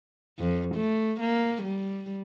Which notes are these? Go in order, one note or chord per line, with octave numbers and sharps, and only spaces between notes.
F2
A3
A#3
G3